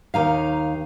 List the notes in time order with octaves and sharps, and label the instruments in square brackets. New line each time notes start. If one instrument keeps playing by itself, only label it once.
[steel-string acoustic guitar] D#2 D#4 F5